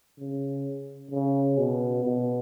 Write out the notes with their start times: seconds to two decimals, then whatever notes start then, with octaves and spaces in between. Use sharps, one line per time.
0.19 C#3
1.11 C#3
1.58 B2
2.05 B2